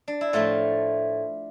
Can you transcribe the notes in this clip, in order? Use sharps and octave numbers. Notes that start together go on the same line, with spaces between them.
D4
E4
A2 F3 A3 F4